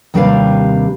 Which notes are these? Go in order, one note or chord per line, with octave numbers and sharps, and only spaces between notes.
D#2 C3 G3 D4 B4 F5